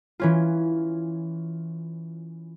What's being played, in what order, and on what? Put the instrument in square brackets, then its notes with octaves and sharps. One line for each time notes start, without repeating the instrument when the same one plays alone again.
[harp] E3 C#4 F4